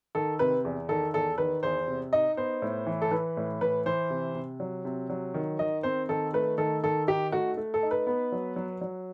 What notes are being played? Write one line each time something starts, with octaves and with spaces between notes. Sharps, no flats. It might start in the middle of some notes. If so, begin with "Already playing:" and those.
D#3 A4
C3 B4
E2
D#3 A4
E2 A4
D#3 B4
E2 C5
C3
D#4 D#5
B3 C5
A2
E3
A4
E3 B4
A2
E3 B4
E3 C5
C3
C3
F#3
C3
F#3
D#3
D#3 D#5
C4 C5
D#3 A4
A3 B4
D#3 A4
D#3 A4
D#4 G4
A3 F#4
A3
A4
D#4
B4
B3
F#3
F#3
F#3